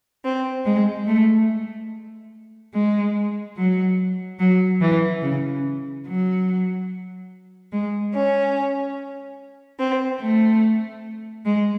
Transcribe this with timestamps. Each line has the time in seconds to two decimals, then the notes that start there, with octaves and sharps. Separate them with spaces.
0.24 C4
0.65 G#3
1.07 A3
2.74 G#3
3.56 F#3
4.39 F#3
4.81 E3
5.22 C#3
6.06 F#3
7.71 G#3
8.13 C#4
9.78 C4
10.21 A3
11.45 G#3